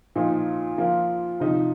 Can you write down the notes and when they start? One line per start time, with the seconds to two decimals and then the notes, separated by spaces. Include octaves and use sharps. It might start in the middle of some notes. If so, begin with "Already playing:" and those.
0.16 A#2 F3 D#4
0.78 F3 A#3 F4
1.40 C3 F3 D#4 G4